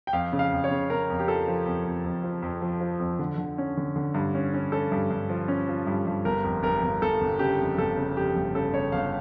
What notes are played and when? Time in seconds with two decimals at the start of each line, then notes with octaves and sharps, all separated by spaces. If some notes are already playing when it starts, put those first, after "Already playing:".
0.07 G5
0.13 F2 F5
0.33 C#3
0.39 F5
0.52 F2
0.64 C#5
0.71 C#3
0.90 C#3 A#4
1.10 F2
1.19 G4
1.28 F3 A4
1.48 F3
1.66 F2
1.85 F2
2.04 F2
2.23 F3
2.42 F2
2.62 F3
2.81 F3
3.00 F2
3.19 D3
3.38 D3
3.58 C#4
3.77 D3
3.96 D3
4.14 G2
4.34 C#4
4.54 C#4
4.72 C#4 A4
4.92 G2
5.10 G2
5.29 F3
5.48 C#4
5.68 F3
5.87 G2
6.07 G2
6.25 G1 A#4
6.44 F2
6.63 G1 A#4
6.83 G1
7.02 G1 A4
7.21 G1
7.39 C#3 G4
7.59 F2
7.78 G1 A4
7.98 C#3
8.17 F2 G4
8.36 G1
8.55 C#3 A4
8.73 C#3 C#5
8.92 G1 F5